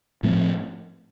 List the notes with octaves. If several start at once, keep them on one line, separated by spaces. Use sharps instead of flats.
A2 F3 A3 C4